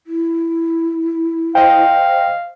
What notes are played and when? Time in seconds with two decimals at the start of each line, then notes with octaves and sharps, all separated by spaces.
0.07 E4
1.55 C5 D#5 F5 G5